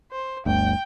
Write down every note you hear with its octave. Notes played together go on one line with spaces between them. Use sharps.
C5
G1 D2 G5